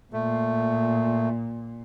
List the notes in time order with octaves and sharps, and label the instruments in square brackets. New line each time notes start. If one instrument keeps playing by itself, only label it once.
[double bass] A#2 [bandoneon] A3